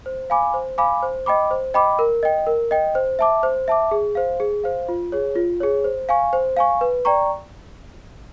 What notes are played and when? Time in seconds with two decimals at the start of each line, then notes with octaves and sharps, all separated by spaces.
0.06 C5
0.30 F5 G#5 B5 D6
0.54 C5
0.78 F5 G#5 B5 D6
1.03 C5
1.26 D#5 G5 B5 D6
1.51 C5
1.74 D#5 G5 B5 D6
1.99 A#4
2.23 D#5 G5
2.47 A#4
2.71 D#5 G5
2.95 C5
3.19 E5 A5 D6
3.43 C5
3.68 E5 A5 D6
3.91 G#4
4.15 C5 F5
4.40 G#4
4.64 C5 F5
4.89 F4
5.12 G#4 C#5
5.36 F4
5.60 G#4 C#5
5.84 C5
6.09 F5 G#5 C#6
6.33 C5
6.57 F5 G#5 C#6
6.81 B4
7.05 D5 G5 A#5 C#6